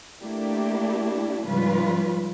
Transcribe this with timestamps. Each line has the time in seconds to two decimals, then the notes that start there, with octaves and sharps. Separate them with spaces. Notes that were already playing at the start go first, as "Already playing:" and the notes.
0.20 A3 A#3 D4 E4 G4
1.45 G#2 C#3 F3 G3 F4 B4